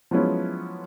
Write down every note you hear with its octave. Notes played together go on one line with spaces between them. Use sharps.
F3 F#3 G#3 B3 C#4 E4